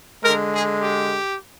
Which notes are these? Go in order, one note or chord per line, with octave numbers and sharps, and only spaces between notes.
D3 G#3 A#4
G#4
G4